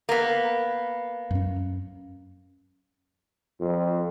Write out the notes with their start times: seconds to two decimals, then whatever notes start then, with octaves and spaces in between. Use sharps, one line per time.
0.09 A#3 B3
1.31 F#2 C#4
3.60 F2